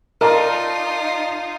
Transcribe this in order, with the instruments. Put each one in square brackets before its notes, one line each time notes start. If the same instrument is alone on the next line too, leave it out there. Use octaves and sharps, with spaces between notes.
[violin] D#4 F4 [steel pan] A#4 [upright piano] D5 D#5 A5